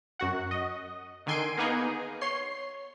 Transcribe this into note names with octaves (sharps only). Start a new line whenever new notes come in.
F#2 F#4 F#5
D#5
D3 D#3 G#5 C6 D7
A#3 B3 D#4 G#4
C#5 C6 C7